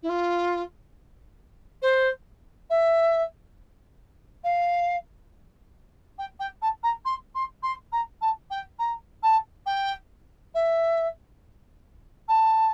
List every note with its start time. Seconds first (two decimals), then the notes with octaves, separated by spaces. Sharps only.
0.03 E4
0.09 F4
1.82 C5
2.70 E5
4.44 F5
6.18 G5
6.40 G5
6.62 A5
6.83 A#5
7.05 C6
7.35 C6
7.63 C6
7.92 A#5
8.21 A5
8.50 G5
8.79 A#5
9.23 A5
9.66 G5
10.54 E5
12.28 A5